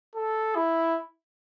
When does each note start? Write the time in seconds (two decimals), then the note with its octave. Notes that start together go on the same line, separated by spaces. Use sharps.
0.15 A4
0.55 E4